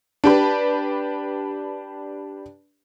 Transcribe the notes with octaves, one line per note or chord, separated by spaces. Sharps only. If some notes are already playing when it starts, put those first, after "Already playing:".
D4 G4 B4